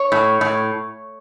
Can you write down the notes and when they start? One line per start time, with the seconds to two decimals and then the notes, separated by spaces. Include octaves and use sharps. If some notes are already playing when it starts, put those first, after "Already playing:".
Already playing: C#5
0.12 A2
0.41 A2